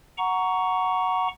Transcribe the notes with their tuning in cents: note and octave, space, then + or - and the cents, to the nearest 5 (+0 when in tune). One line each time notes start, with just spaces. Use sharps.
F#5 +0 A#5 +0 C#6 +15